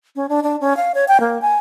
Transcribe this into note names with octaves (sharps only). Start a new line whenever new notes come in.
C#4
D4
D4
C#4
F5
C#5
G5
A#3
G#5